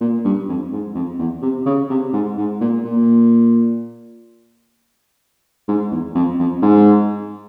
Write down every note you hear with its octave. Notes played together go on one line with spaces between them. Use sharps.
A#2
G2
F2
G#2
F2
E2
C3
C#3
C3
G#2
G#2
A#2
A#2
G#2
E2
F2
F2
G#2